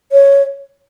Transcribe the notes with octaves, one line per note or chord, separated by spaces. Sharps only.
C#5